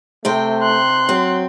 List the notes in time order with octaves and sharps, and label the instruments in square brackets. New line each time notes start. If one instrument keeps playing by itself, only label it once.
[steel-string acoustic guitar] C3 C5 G5 [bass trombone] A3
[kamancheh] C6 F#6
[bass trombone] F#3 [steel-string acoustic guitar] C4